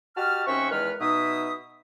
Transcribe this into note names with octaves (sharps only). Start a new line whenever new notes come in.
F#4 G4 D#5 A5 F6
D#2 C4 C#4 E5 F#5 C#6
E2 D#3 G#3 B4 F6
B2 D#4 E5 D#6